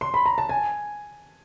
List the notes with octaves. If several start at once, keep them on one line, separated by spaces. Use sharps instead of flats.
C6
B5
A#5
A5
G#5